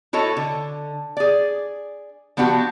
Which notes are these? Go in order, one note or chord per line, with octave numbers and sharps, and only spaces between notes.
E4 F#4 A4 C#5 D#5
D3
G#4 D5
F3 B3 D4 F#4 G4